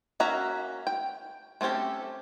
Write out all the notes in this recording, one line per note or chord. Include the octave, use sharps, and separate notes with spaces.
A#3 C#4 F#4 E5 A#5
G5
A3 C4 C#4 G4 A4